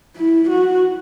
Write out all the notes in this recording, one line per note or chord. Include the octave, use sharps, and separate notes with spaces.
E4
F#4